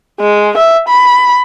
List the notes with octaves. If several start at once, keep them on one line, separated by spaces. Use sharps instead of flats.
G#3
E5
B5